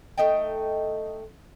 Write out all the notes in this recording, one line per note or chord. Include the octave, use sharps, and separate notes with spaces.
A3 D#4 D#5 G5